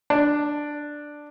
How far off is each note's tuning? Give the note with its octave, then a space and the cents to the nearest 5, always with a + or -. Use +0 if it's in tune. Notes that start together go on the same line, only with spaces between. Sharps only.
D4 +5